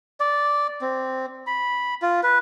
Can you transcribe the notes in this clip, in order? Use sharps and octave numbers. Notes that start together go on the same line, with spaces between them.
D5
C4
B5
F4
B4